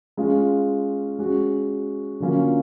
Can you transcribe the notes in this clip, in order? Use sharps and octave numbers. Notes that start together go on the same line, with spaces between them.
G#3 C#4 F4
G#3 C#4 F#4
D3 F#3 A#3 C#4 F4